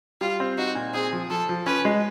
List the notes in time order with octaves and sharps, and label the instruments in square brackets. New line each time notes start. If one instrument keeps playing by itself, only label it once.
[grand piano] G3 [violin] F4
[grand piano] C4
[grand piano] D#4 [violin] F#4
[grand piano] A#2
[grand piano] C4 [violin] G#4
[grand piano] F3
[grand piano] F3 [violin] A4
[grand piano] F3
[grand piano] C#4 [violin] B4
[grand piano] G#3